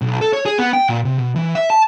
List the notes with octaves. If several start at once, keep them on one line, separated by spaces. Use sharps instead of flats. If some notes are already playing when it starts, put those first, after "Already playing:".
B1
A4
C#5
G#4
B3
G5
A#2
C3
B2
E3
E5
A5